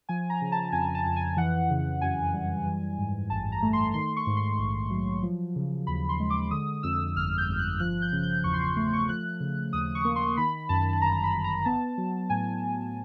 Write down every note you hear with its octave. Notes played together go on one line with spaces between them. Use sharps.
F3 G#5
A#5
C#3
A5
F2 G#5
A5
F2
G#5
E3 F#5
C#3
F#2 G#5
G3
E3
G#2
A1 A5
A#5
A3
C6
D#3 C6
C#6
G#2
C6
A#1
F#3
F3
C#3
D#2 B5
C6
G#3
D6
D3 D#6
F2 E6
G1 F6
G6
G1
F#6
F3 F#6
G6
C#3
G6
E2 C#6
C6
C#6
A3 C6
C#6
F3 F#6
C#3
D#2 D#6
C#6
A#3
C6
D#3 B5
F#2 A5
A5
G1 A#5
B5
G1
A#5
B3 A5
F#3
A2 G#5